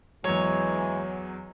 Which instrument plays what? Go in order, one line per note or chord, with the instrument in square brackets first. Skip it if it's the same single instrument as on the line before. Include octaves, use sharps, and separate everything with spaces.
[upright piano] E2 F#3 [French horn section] E3 G#3 [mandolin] C#5